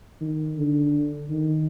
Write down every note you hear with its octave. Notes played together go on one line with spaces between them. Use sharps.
D#3
D3
D#3